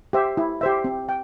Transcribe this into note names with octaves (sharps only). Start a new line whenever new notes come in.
G4 C5 E5
E4
G4 C5 E5
C4
G5